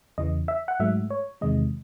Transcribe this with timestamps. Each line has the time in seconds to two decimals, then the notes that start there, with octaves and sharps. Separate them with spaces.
0.18 E2 C#3 E3 D#5
0.48 E5
0.68 F#5
0.80 G#2 F#3 A3 E5
1.10 C#5
1.41 E2 C3 D#3 G#3 D#5